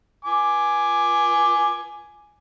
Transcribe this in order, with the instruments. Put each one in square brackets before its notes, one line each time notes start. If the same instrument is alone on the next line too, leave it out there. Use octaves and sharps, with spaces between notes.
[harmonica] G#5 D6